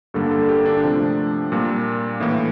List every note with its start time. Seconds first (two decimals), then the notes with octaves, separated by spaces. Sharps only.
0.14 G2 D3 G3 A#3 A4
0.31 A4
0.49 G4
0.66 D4
0.83 C3 F3 A3
1.52 A#2 G3 A#3
2.20 A2 E3 A#3 E4